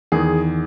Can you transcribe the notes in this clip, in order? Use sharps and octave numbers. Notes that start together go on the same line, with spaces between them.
E2 D#3 G#4